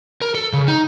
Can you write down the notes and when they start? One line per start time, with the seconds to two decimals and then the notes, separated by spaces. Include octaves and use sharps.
0.21 A#4
0.35 A4
0.53 C#3
0.68 D#4